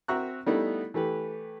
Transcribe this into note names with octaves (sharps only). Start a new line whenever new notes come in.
C4 F#4 E5 A#5 C#6 F#6
G3 A3 B3 D#4 E4
E3 A3 G4 B4